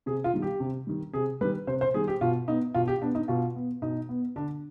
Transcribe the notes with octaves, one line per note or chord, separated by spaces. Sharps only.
C3 G#4
F4
D#3 G3
G4
C3
D#3 G3
C3 G#4
D#3 G3 B4
C3 C5
C5
D#3 G3 G#4
G4
B2 F4
B3 D#4
B2 F4
G4
B3 D4
D#4
B2 F4
B3
B2 D#4
B3
D3 D4